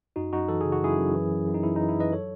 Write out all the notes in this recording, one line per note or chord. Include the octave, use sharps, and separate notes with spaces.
F#2 D#4 F#4
F#2 D#4 F#4
E3 A4
C#3 G#4
F#4
F#2 E4 G#4
F#2
E3
F#2
F#2
D#4
E3 E4
D#4
E3
E4
F#2 B4 D#5
F#3 A4 C#5